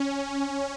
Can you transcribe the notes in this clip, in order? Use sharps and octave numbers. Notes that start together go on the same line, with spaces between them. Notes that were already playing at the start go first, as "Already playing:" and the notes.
Already playing: C#4